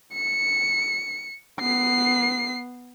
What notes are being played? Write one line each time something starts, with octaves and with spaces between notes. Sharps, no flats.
C#7
B3 C7